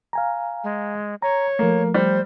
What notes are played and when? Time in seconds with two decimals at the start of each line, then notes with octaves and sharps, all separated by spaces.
0.13 F5 G#5 A#5
0.64 G#3
1.22 C#5 A#5
1.59 F3 A3 A#3
1.94 G3 C5